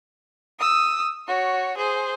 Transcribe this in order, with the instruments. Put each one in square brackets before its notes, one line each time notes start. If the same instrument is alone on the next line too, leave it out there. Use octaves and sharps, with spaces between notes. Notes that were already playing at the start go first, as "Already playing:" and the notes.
[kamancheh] D#6 E6
F#4 C#5
G#4 C5